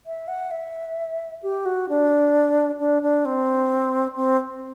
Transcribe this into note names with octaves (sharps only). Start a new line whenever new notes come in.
E5
F#5
E5
G4
F#4
D4
D4
D4
C4
C4